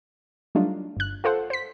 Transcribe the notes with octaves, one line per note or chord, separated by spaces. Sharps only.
F#3 G3 A3 D4 D#4 F4
G1 F#6
F4 A4 C5 F#5
C5 B6